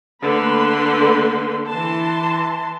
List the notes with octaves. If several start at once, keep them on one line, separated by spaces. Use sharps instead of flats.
D3 A3 A#3 B4 C6
E3 A5 C6